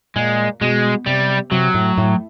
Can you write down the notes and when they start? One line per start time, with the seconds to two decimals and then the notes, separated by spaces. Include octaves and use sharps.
0.16 A#2 G#3
0.61 B2 G#3
1.06 C3 G3
1.52 C3 F#3
1.75 A2
1.98 A2